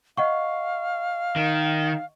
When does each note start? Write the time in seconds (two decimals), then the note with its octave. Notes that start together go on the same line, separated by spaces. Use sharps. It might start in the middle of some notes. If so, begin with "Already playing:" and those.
0.17 D#5 F5 F#5 C#6
1.36 D#3